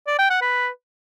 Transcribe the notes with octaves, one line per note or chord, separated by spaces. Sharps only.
D5
G5
F#5
B4